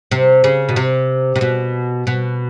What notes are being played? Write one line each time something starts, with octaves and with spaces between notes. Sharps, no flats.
C3
C#3
B2
C3
C3
B2
B2